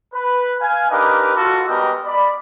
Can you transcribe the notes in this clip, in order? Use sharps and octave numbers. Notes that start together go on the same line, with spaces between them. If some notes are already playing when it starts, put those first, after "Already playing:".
B4
F5 G#5
D4 D#4 G4 A#4 B4
F4 F#4 A4
G3 G#3 B3 G4 A#4 D#5
D5 B5